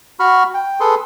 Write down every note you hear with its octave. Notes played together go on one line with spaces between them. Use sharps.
F#4 B5 C#6 F6
G5
G#4 A4 B4 C6